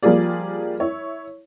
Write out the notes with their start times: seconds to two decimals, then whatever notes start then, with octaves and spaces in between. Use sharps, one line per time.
0.03 F3 G3 A#3 F4 G#4 D5
0.80 E4 C#5